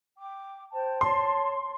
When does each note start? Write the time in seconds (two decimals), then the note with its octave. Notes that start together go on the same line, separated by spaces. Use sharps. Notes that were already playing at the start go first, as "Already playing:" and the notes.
0.18 G5 D6
0.71 C5 G5 A5
1.01 C#5 A5 C6